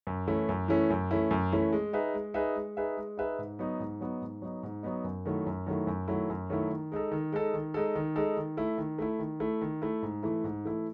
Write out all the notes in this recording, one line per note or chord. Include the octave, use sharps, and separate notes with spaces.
F#2
E3 A3 C#4 E4
F#2
E3 A3 C#4 E4
F#2
E3 A3 C#4 E4
F#2
E3 A3 C#4 E4
G#3
D#4 G#4 B4 E5
G#3
D#4 G#4 B4 E5
G#3
D#4 G#4 B4 E5
G#3
D#4 G#4 B4 E5
G#2
F#3 B3 D#4
G#2
F#3 B3 D#4
G#2
F#3 B3 D#4
G#2
F#3 B3 D#4
F#2
D#3 F#3 A3 E4
F#2
D#3 F#3 A3 E4
F#2
D#3 F#3 A3 E4
F#2
D#3 F#3 A3 E4
D#3
G#3 D#4 A4
D#3
G#3 D#4 A4
D#3
G#3 D#4 A4
D#3
G#3 D#4 A4
D#3
A3 E4
D#3
A3 E4
D#3
A3 E4
D#3
A3 E4
G#2
E3 A3 E4
G#2
E3 A3 E4